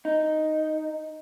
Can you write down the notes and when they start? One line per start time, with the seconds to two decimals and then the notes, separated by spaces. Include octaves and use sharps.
0.05 D#4